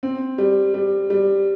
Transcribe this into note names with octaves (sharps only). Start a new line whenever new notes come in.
C4
G3
G3
G3